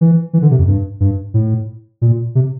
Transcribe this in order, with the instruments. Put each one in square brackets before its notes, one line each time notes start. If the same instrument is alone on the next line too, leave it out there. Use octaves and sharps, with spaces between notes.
[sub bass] E3
E3
D3
C3
F2
G2
G2
A2
A#2
C3